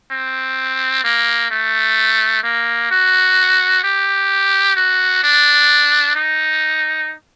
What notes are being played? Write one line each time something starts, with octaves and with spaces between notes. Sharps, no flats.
C4
A#3
A3
A#3
F#4
G4
F#4
D4
D#4